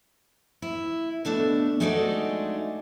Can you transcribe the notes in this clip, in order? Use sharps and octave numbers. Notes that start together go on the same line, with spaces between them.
E4
B2 A3 D4 E5
G#3 A3 D4 D#4 F#4 D5